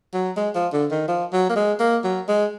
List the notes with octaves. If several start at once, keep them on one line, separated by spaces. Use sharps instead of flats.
F#3
G#3
F3
D3
D#3
F3
F#3
A#3
G#3
A#3
F#3
G#3